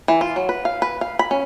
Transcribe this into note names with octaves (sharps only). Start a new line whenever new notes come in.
E3
F4
F#3
B4
F5
B4
F5
B5
C#4